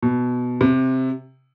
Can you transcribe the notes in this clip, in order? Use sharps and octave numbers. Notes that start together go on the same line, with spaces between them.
B2
C3